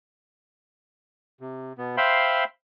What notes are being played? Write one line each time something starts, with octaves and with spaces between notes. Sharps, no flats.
C3
B2 B3
C5 E5 F5 G5 B5 C6